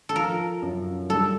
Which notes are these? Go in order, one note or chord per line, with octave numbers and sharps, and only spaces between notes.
A4
F3 A#4
F#2
G3 A4